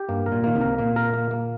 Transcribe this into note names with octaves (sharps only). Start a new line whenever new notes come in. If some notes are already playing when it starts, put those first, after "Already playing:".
Already playing: G4
G2 A#3
A#4
A#2
D#3 A#3
C2 C3
A#4
A#2 A#3
A#4
A#3
A#3